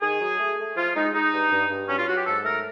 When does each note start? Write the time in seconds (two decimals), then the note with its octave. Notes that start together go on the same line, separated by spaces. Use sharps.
0.01 D#3 G#4
0.21 F#3
0.39 A3
0.58 A3
0.76 F3 F4
0.95 G#3 D#4
1.14 G#3 D#4
1.33 G2
1.51 G2
1.70 G2
1.88 F#3 C#4
1.98 F4
2.07 F#3 F#4
2.16 G4
2.26 G#2 A4
2.45 A3 A#4